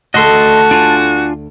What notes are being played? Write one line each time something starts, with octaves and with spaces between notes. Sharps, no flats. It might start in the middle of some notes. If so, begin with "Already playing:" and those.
D2 F#4 A4 D#5 A5 C6
D4 F4 G#5